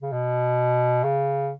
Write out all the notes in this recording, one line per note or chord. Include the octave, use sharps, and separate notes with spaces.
C#3
B2
C#3